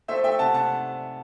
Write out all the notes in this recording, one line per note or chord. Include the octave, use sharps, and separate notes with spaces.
A3 C5 E5
A3 E5 G5
C3 F#5 A5
C3 F#5 A5